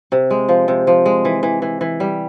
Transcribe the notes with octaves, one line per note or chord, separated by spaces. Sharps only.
C3
G#3
F3
C3
F3
G#3
E3
E3
E3
E3
G3